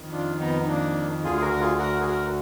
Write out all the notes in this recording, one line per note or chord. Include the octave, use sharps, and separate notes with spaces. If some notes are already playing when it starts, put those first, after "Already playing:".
Already playing: F2 D#3
D4 F4
B3 D#4
D#4
A#3 D4
D2 D3 F4 G#4
G#4
F#4 A#4
A#4
F4 G#4
F#4 A#4
G#4
F#4 A#4